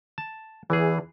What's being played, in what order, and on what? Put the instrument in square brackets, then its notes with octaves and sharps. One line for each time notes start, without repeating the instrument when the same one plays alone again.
[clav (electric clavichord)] A5
[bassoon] E2 [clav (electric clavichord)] E3 G#4